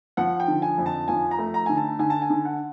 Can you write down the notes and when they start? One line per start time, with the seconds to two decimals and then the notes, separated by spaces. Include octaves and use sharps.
0.17 F3 F#5
0.40 G5
0.48 D3
0.62 G#5
0.78 F2
0.86 A5
1.08 F3 G#5
1.31 A#5
1.38 A3
1.54 A#5
1.66 D3 G#5
1.77 A5
1.99 D3 G#5
2.10 A5
2.22 G#5
2.30 D3
2.45 F#5